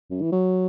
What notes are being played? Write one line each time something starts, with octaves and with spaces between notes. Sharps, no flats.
F#2
E3
F#3